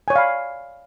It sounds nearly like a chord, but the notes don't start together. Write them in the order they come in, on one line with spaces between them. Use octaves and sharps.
G#5 C#5 D5 F5 B5